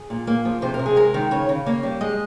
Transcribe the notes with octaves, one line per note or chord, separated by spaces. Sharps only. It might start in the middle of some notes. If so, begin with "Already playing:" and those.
Already playing: G#4
A#2
A#3
F3
C3 C5
A#4
C3
G#4
G#3 A#4
D#3
C#3 C#5
C#3
A#3 C#5
G3
G#3 D#5